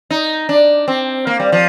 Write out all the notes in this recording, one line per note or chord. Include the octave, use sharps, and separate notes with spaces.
D#4
D4
C4
A#3
G3
F3